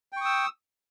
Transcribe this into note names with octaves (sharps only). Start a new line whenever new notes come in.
G5 C#6 D#6 E6